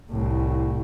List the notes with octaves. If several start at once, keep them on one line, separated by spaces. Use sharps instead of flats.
C2 A2